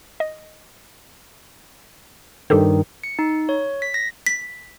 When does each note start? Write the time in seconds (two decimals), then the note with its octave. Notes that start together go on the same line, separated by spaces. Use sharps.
0.20 D#5
2.50 G2 D#3 G4 A4 C5
3.04 C#7
3.19 D#4
3.49 C#5
3.82 B6
3.94 A#6
4.27 B6